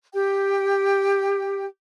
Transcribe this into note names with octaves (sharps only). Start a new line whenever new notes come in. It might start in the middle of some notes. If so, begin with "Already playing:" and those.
G4 G5